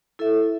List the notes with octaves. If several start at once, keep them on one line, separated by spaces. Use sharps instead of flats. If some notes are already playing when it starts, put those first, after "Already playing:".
E4 A4 E5